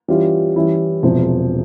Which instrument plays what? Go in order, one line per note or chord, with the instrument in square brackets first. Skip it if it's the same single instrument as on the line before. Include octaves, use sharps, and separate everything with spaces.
[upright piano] E3 G3 C#4 F4
E3 G3 C#4 E4
E1 E2 C3 F3